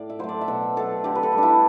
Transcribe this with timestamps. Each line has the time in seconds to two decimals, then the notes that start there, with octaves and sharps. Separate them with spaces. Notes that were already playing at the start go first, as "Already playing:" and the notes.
Already playing: A2 D5
0.10 E5
0.19 F#3 A3 C5
0.29 D5
0.41 E5
0.48 B2 F#5
0.77 F#3 A3 A4
1.04 D3 G4
1.15 B4
1.23 A4
1.32 G3
1.38 D4 E4